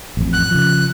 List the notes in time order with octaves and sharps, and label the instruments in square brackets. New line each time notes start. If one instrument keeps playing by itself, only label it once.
[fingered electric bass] A1 F2
[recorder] F#6
[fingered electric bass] C#3 F3